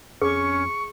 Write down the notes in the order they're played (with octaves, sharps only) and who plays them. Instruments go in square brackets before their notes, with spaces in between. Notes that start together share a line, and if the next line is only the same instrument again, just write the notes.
[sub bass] F2 [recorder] C#4 [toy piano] G#4 [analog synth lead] C#6